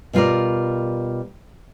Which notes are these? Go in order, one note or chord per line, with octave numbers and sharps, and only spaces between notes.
B2 G3 F4 A#4 D5